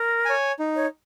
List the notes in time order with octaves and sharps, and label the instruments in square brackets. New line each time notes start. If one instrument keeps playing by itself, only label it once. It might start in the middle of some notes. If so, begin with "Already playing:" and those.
Already playing: [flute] A#4
[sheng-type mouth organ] C#5 G#5
D#4
[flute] C#5